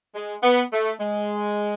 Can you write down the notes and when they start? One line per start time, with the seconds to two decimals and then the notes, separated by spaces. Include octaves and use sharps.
0.15 G#3
0.43 B3
0.73 A3
1.01 G#3